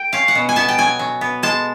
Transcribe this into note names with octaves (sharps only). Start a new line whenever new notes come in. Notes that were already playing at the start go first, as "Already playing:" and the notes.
Already playing: G5
C#4 F5
F#5
B2
G#5
B3 A5
G5
F#3 G#5
F#3
B3
G#3 A5